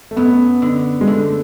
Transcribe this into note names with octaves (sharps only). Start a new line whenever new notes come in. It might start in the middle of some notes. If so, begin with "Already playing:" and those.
A3
F#2 B3
D3
G#3
D3 A3